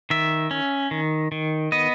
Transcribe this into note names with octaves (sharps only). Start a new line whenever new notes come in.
D#3 E5
C#4
D#3
D#3
B3 D#5